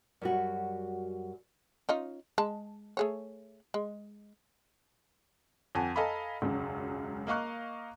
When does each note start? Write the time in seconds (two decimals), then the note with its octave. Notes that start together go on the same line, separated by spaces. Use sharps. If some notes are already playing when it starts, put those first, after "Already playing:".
0.22 F#2 G3 F#4
1.89 C#4 D#4 F4
2.38 G#3 A5
2.97 A3 G#4 C#5
3.74 G#3
5.75 F2 F#5 G#5 A5
5.96 A4 D#5 F5 G#5 A#5 B5
6.42 E1 C#2 F#2
7.27 A#3 D#5 F5 C#6 F#6